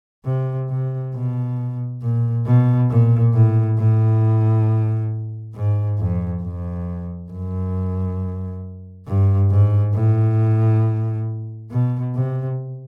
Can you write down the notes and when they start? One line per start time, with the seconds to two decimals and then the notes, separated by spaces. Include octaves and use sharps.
0.25 C3
0.70 C3
1.15 B2
2.02 A#2
2.46 B2
2.90 A#2
3.34 A2
3.78 A2
5.55 G#2
5.98 F2
6.42 F2
7.31 F#2
9.07 G2
9.50 G#2
9.94 A2
11.70 B2
12.14 C3